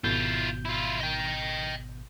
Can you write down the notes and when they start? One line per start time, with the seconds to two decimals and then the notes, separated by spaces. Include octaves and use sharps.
0.04 G#1 B2 E4 F4 G6
0.65 E4 F4
1.01 D#5 G5